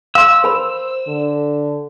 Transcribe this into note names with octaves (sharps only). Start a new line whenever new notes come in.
F5 C6 E6
A#4 C5 B5
D3